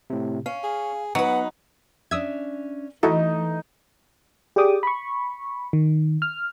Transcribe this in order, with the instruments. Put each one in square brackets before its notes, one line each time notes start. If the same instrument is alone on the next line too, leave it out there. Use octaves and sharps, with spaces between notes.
[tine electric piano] A2 C3
[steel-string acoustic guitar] C#4 [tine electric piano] F5
[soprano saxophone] G#4
[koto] F#3 [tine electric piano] B3 [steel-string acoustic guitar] D#4 B4 [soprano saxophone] F#5
[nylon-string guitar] C#4 D4 E5 [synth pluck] D#6 E6 G#6
[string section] E3 [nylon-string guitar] A3 [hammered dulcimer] D#4 [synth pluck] E4 F#4 A4
[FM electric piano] G4 G#4 D5 G5 D6 D#6
B5 C#6
D#3
F6